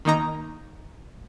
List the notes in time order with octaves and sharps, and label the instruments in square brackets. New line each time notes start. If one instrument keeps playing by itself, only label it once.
[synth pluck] D#3 A#3 D#4 A#5